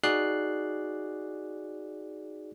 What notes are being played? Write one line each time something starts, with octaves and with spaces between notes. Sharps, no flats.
D#4 F#4 G#4 D5 F#6 C7